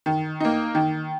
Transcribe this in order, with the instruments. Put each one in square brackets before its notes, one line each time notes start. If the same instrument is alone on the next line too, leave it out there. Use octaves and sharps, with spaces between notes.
[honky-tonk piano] D#3
A#3 D#4
D#3